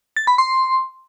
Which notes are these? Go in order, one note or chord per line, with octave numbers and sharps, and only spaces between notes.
A6
B5
C6